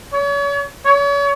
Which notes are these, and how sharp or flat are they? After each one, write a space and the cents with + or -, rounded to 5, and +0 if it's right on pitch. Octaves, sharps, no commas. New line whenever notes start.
C#5 +40
C#5 +40